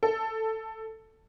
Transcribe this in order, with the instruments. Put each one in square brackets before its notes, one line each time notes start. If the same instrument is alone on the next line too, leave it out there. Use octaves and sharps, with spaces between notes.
[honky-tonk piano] A4